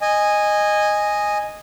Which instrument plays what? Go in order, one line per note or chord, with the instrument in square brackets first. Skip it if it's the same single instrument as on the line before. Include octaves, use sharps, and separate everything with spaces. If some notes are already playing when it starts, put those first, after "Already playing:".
[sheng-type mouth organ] D#5 G#5